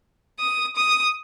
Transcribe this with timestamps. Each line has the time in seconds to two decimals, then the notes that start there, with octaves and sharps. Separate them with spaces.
0.40 D#6
0.77 D#6